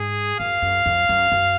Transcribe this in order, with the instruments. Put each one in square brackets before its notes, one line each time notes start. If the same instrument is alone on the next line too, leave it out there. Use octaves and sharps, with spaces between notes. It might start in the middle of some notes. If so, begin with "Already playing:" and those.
Already playing: [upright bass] G#2 [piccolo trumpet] G#4
[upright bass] F#2 [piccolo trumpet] F5
[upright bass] F#2
F2
F#2
F#2